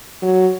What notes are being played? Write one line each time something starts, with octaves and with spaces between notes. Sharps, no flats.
F#3